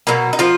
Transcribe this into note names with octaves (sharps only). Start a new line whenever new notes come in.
B2 F#3 A#3 A#4
D#4
F3 F4